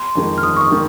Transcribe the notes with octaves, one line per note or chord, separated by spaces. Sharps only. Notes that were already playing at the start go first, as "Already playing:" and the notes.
Already playing: C6
F2 D#3 G#3
F6
G1 D#6
C#6
D#6
D#3 G#3